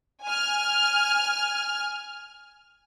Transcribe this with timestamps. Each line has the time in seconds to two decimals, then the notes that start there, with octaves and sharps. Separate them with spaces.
0.24 G#5 F6